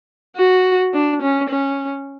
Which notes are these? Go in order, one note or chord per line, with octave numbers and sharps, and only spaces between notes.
F#4
D4
C#4
C#4